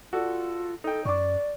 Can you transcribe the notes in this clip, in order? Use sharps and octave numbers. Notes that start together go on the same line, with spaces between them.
F4 F#4 A4 D5
D#4 A4 G5
F#2 D5 C#6 D6